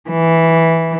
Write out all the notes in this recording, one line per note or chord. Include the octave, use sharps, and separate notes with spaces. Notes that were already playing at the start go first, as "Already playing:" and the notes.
E3